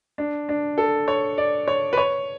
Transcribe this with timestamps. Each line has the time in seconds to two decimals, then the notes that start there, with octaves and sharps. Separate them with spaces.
0.18 D4
0.49 D4
0.78 A4
1.08 C#5
1.38 D5
1.68 C#5
1.93 B4
1.97 C#5